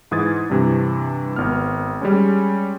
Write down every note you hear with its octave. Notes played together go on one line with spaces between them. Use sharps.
G#2 E3 D#6 G#6 A6
G2 C3 E3
G#1 B3 F6
G3 G#3 C#4